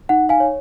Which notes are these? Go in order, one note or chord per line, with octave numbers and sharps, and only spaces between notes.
D#4 F#5
F5 G#5
C#5